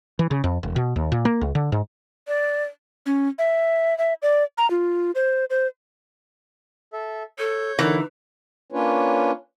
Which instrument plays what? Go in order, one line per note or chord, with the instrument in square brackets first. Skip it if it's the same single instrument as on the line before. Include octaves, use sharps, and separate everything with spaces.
[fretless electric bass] E3
C#3
F2
E1
B2
D#2
A#2
A#3
C#2
D3
G#2
[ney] D5
[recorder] C#4
E5
E5
D5
A#5
F4
C5
C5
[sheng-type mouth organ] A4 E5
[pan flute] A4 [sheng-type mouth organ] C#5 G6
[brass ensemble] D3 B3 A#4 [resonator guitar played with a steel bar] E3 [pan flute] D#4
[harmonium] A#3 C#4 D4 F4 B4 C#5